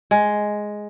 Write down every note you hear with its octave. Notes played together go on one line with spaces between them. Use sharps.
G#3